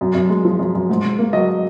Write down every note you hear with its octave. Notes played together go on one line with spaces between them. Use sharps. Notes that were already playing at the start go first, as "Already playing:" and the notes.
F#2
F#2
G#3
F3
F#2
F#2
G#2
G#2
A#3
F#3 D#5